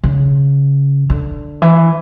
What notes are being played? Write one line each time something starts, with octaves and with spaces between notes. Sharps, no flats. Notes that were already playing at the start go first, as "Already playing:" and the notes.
C#3
D3
E3